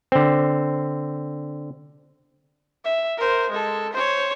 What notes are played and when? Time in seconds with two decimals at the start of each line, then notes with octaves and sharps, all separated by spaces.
0.12 D3 C4
2.84 E5
3.17 A#4 C5
3.50 G#3 A4
3.93 C5 C#5